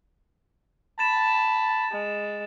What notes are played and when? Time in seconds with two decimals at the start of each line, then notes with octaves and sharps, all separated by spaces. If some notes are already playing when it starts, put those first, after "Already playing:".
0.99 A5 B5 A6 E7
1.91 G#3